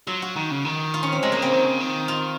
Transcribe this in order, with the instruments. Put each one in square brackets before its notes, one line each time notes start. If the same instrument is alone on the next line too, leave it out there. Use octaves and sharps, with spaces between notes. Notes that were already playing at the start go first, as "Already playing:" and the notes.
[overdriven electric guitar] F#3 [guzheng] F4
[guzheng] F#4
[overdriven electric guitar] D#3
C#3
D#3
[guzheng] F4
C#4
C4
[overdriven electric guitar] C3 [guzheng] G#3
[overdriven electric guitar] C#3 [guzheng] A#3
[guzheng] C4
[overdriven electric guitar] D#3
C#3
D#3
[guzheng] F4